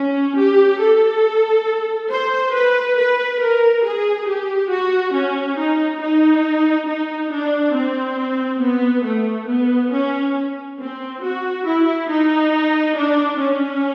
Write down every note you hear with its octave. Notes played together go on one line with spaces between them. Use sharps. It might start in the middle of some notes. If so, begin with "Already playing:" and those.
Already playing: C#4
G4
A4
C5
B4
B4
A#4
G#4
G4
F#4
C#4
D#4
D#4
D#4
D4
C4
B3
A3
B3
C#4
C4
F#4
E4
D#4
D4
C#4